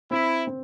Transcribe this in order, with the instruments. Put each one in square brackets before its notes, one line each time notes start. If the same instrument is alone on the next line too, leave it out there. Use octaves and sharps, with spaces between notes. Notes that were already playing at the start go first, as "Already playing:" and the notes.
[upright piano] C4 [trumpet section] E4
[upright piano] C4